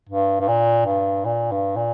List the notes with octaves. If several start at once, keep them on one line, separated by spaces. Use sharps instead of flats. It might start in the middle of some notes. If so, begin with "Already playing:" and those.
G2
G2
A#2
G2
A#2
G2
A#2